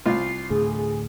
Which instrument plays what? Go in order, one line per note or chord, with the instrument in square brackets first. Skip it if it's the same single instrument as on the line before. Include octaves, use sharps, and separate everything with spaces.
[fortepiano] C2 F4 [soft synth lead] C7
[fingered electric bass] D2 A2 D3 [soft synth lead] G#4